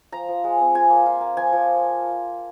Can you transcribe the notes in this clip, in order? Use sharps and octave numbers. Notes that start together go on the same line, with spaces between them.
F3 A#5
F3
G#3
C4
F4 G#5
A#3
F4
A#3
F3 G#5
F3